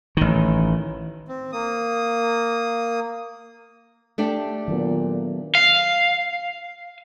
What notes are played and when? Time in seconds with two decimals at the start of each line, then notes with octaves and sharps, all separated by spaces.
0.17 A1 D#3
1.28 C4
1.52 A#3 D#6
4.18 A3 D4 G4
4.68 A#2 D#3 F#3 B3
5.55 F5